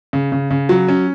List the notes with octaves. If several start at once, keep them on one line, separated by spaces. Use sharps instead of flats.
C#3
C#3
C#3
F#3
C#4